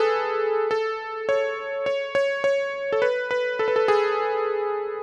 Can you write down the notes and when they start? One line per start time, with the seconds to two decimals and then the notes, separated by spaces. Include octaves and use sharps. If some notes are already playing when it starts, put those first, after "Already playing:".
Already playing: G#4 A4 B4
0.71 A4
1.29 C#5
1.86 C#5
2.15 C#5
2.44 C#5
2.92 A4
3.02 B4
3.31 B4
3.59 A4
3.68 B4
3.76 A4
3.88 G#4